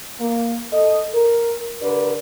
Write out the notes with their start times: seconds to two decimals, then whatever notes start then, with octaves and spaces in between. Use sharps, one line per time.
0.20 A#3
0.73 A4 D#5
1.14 A#4
1.82 D3 G4 A#4 B4 D5